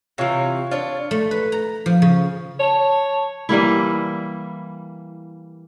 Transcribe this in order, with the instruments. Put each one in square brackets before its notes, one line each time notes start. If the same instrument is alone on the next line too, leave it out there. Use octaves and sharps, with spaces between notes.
[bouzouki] C3 E3 [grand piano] F4 C#5 F5
[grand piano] D4 [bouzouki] F4 C#5 D5
[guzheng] A3
B4
A#5
F3
C#3
[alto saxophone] C#5 [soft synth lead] A5
[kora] E3 G3 A#3 E4